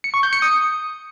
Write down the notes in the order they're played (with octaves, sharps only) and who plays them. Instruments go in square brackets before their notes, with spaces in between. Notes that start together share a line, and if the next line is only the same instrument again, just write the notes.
[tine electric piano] C#7
C#6
G6
C#7
D#6